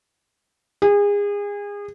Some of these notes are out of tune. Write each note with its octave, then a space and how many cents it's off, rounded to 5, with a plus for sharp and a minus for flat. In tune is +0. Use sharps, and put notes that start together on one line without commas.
G#4 -30